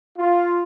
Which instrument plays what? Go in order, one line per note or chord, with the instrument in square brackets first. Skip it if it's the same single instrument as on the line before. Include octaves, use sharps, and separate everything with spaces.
[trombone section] F4